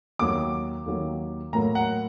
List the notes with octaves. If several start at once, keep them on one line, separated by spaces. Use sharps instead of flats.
D#2 D#3 F#3 D6
D#2 D#3 F#3
A2 F#3 A#3 A#5
F#5